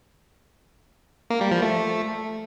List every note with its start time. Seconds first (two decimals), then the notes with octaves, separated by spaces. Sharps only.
1.30 A#3
1.41 G3
1.52 F3
1.62 A3